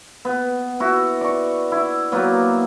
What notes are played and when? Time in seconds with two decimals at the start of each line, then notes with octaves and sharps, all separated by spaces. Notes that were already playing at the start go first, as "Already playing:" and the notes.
0.25 B3
0.80 E4 F#4 E5
1.21 D5 C#6
1.72 E4
2.12 F#3 A#3 B3